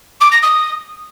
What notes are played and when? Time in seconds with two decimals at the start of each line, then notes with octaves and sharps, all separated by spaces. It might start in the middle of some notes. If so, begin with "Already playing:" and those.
0.20 D6
0.31 A#6
0.42 D#6